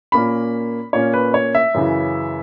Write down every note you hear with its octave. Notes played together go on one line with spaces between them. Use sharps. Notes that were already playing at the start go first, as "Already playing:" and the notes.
A#2 A#3 C#4 B5
A#2 A#3 C#4 C#5
B4
C#5
E5
F#2 C#3 E3